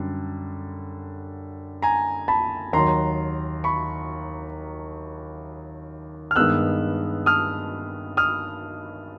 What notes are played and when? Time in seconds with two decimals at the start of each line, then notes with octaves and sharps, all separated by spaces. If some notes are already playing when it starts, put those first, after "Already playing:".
Already playing: F#2 D3 G3
1.82 G#5 A#5
2.28 A5 B5
2.73 D#2 D#3 F#3 A#5 C6
3.64 B5 C#6
6.31 F6
6.36 G2 D#3 G#3 B3 E6 F#6
7.26 D#6 F6
8.17 D#6 F6